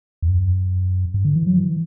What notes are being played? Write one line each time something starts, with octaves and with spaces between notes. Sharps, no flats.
E2
F#2
G2
D3
E3
F#3
E3